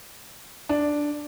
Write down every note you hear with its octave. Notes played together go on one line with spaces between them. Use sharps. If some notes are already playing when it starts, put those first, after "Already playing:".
D4